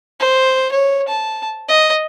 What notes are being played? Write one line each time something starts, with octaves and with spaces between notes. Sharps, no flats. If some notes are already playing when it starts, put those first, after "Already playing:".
C5
C#5
A5
D#5